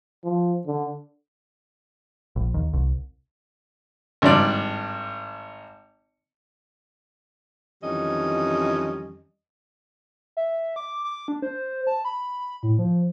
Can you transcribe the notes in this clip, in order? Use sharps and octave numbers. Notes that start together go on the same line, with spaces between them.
F3
D3
A#1
D#2
C2
G#1 G2 D5
F2 D#3 E3 G3 C#4 D#5
E5
D6
D6
D4
C5
A5
B5
A2
F3